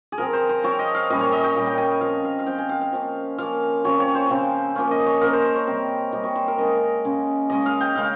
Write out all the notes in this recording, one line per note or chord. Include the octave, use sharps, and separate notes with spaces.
G#4
F3 C4 A#4
C5
C5
F3 C4 C#5
D#5
F5
A#2 G3 C#4 D#5
C#5
D#5
G5
A#2 G3 C#4
G5
G#5
F3 C4 F5
F5
F5
F3 C4 G5
G#5
F5
F5
F3 A#3 C#4
F3 A#3 C#4 F5
C#3 F3 C4 C#5
C#5
C5
C#3 F3 C4
F3 A#3 C#4
D#5
C#5
F3 A#3 C#4 A#4
C5
C5
C#5
C3 G3 C4
C3 G3 C4 D#5
C#5
C5
A#4
C#3 G#3 C#4 D#5
C#3 G#3 C#4
C#3 G#3 C#4 D#5
F5
G5
C#3 G#3 C#4 F5